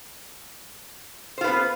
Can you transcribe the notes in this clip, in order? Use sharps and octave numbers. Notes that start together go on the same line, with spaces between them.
B3 F4 B4 C5